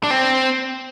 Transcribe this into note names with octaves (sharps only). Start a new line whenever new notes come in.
D4
C4